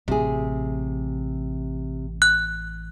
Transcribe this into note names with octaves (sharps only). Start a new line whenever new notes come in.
A1 C3 G#4
F#6